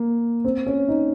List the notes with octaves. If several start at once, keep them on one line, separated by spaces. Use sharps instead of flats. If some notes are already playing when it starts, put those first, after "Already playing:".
Already playing: A#3
C4
C#4
D#4